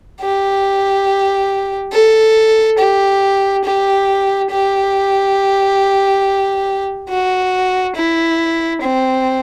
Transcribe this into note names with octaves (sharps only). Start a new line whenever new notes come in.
G4
A4
G4
G4
G4
F#4
E4
C4